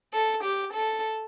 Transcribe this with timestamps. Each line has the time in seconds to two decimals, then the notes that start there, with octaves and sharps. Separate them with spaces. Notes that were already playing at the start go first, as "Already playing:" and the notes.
0.13 A4
0.43 G4
0.73 A4